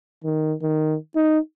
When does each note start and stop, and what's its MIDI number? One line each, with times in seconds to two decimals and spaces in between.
0.24 0.54 51
0.62 0.96 51
1.15 1.38 63